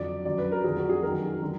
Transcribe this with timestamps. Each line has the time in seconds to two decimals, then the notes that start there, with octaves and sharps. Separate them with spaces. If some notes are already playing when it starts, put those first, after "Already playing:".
Already playing: F2 D3 F#3 D5
0.25 F#2 D3 F#3 D5
0.38 B4
0.52 A#4
0.64 F2 D3 F#3 G#4
0.77 F#4
0.89 G#4
1.03 F#2 D#3 F#3 A#4
1.41 D3 F#3